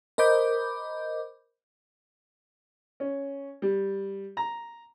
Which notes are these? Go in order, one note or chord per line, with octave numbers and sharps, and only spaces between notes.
A#4 C5 D#5 B5 D6 G6
C#4
G3
A#5